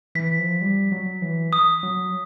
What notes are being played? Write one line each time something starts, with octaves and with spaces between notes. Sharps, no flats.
E3 B6
F3
G3
F#3
E3
D#6
F#3